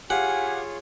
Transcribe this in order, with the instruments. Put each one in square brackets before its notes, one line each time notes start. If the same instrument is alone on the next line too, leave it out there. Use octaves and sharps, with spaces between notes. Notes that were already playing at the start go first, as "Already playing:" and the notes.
[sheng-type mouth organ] F4 G#4 C#5 [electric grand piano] G4 F5 [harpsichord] F#5 [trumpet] G#5